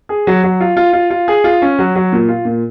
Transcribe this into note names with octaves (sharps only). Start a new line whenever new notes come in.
G#4
F#3
F#3
F4
F4
F4
F4
G#4
F4
C#4
F#3
F#3
A#2
F4
A#2